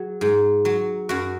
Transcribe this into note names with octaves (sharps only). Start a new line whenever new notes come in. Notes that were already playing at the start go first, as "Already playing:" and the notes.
Already playing: F#3 G#4
G#2
F#3
F#2 F#4